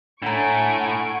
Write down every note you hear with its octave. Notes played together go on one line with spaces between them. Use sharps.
A2 A3 D4 F#5 G#5 A#5 C#6 D7